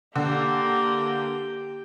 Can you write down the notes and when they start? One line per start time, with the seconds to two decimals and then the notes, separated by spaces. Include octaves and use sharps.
0.16 D3 A#3 G4 G5